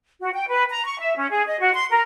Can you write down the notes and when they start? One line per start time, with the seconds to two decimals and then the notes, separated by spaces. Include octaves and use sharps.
0.21 F#4
0.34 G5
0.49 B4
0.70 A#5
0.85 C#6
0.99 E5
1.17 C#4
1.30 G#4
1.47 D#5
1.61 F#4
1.74 C6
1.91 A#4